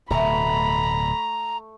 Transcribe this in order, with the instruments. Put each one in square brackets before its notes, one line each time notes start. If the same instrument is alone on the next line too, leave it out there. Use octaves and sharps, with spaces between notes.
[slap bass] D1 B2 [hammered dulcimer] A3 [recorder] A#5 [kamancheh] B5